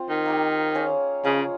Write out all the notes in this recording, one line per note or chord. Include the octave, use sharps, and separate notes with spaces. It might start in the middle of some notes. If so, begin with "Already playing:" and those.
Already playing: C4 F4 C5
D#3
A#3 D#4 G4
C#4 G#4 C#5 F5
C#3 F3 G#3 C#4 G#4